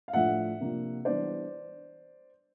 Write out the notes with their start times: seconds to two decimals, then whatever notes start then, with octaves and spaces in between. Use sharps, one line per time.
0.08 F5
0.13 A2 F3 A3 D4 F4 E5 F#5
0.60 C3 F3 A#3 D4 F4
1.05 E3 G3 B3 D4 C5 D5